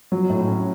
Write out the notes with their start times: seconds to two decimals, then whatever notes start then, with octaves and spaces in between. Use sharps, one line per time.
0.12 F#3
0.30 A2
0.48 C#4